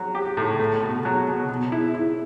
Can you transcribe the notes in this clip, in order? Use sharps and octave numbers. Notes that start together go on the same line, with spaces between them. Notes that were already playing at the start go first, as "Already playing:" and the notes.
Already playing: F#3
G4
A2
A3
B2
F#3
B2
B2
E4
E4